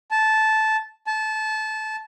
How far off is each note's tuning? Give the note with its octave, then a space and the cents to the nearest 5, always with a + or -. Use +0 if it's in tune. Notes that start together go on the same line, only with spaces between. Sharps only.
A5 -10
A5 -20